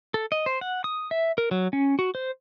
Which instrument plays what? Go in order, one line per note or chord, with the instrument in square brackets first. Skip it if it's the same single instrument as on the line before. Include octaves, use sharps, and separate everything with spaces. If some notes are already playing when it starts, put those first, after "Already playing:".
[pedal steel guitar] A4
D#5
C5
F#5
D#6
E5
A#4
F#3
C#4
F#4
C5